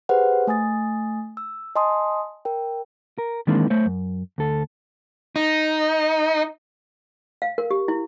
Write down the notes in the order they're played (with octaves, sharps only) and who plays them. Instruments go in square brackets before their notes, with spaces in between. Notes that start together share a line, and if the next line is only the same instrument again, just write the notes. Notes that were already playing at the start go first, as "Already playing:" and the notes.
[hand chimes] G4 G#4 B4 C5 F#5
A3 G#5 D#6 A6
E6
D#5 G#5 A5 C6 D#6
A#4 G5
[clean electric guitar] A#4
D#3 E3 G#3 A#3 C4 D4
A3 C5 C#5
F#2
D2 A4
[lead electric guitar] D#4
[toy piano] F5
A#4
G4
E4